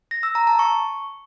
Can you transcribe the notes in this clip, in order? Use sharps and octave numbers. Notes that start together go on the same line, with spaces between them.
A#6
E6
A#5
A5
C#6